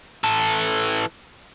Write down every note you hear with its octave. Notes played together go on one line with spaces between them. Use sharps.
E3 A4